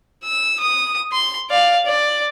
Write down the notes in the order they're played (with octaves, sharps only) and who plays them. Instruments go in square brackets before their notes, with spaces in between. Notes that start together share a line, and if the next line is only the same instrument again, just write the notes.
[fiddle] E6
D#6
C6
D5 F5
D5